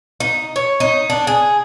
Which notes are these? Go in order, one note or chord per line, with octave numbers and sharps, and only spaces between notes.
D#4
C#5
D#4
D4
G#4